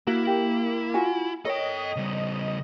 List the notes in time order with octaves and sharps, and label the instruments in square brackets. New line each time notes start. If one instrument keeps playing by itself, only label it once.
[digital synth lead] A#3 [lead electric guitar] E4 [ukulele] F#4
[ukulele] G4
F4 F#4 G#5
[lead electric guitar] A4 G5 [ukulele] A#4 C#5 [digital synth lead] D#5
[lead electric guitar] C#3 G3